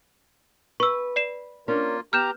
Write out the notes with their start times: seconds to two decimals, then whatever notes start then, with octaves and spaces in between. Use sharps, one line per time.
0.80 B4 C#6 E6
1.16 D5 C7 E7
1.68 A#3 C#4 D4 F4 A#4
2.13 B3 G4 A#5 F6 G6 E7